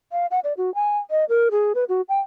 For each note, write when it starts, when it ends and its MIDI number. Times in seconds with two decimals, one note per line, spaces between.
0.12 0.26 77
0.31 0.40 78
0.44 0.53 74
0.57 0.73 66
0.75 0.98 80
1.11 1.25 75
1.29 1.49 70
1.51 1.73 68
1.75 1.84 71
1.89 2.01 66
2.09 2.20 79